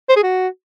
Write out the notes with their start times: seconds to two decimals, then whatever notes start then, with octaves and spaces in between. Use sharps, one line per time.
0.09 C5
0.16 G#4
0.23 F#4